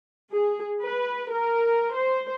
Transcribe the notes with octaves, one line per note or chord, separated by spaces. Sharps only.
G#4
B4
A#4
C5